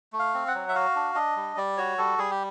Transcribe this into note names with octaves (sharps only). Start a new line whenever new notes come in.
A3
F5
C4
F#5
F#3
E5
F#4 F5
D4
D4 D#5
G3
G3 D5
F#4 C#5
G3 A4
G3 G#4
G4